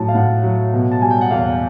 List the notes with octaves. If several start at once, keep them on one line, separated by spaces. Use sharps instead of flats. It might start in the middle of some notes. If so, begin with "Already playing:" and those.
Already playing: A2 F#3 A5
F5
A2 F#5
F#3
B2
A5
G3 G#5
G5
F#5
E2 F5